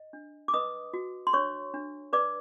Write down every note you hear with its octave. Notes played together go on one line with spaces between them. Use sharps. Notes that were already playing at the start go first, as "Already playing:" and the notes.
Already playing: D#5
D4
D6
B4 D#5 D#6
F#4
C6
D4 C#5 C#6
D4
B4 D5 D6